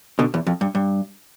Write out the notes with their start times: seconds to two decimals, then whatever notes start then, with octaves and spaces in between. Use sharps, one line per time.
0.19 B2 D3
0.34 E2
0.47 F2
0.61 G2
0.75 G2